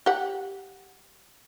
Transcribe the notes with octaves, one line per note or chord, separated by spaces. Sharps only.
G4 F#5